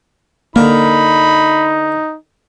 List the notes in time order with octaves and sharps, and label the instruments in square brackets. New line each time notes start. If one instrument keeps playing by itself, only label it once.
[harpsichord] D3 A#4 [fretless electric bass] A#3 [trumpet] D#4 [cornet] B5